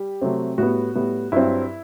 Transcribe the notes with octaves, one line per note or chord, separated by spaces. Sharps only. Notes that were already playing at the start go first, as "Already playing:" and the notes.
Already playing: G3 G4
C3 F#3 A3 C4
A2 G3 B3 F#4
A2 G3 B3
G2 F#3 C4 E4